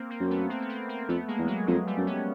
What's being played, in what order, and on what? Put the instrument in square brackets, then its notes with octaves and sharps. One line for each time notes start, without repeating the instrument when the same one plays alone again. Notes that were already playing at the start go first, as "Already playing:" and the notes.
Already playing: [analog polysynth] A#3 C4
A#3 C4
[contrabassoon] F#2
[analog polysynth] A3 B3
A#3 C4
B3
A#3 C4
A#3 C4
[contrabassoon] F2 [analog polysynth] A3 B3
[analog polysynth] G#3 A#3
[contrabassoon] E2
[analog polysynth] F#3 G#3
[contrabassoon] F2 [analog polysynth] F#3 G#3
[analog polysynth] G3 A3
[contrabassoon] F#2
[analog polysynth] B3 C#4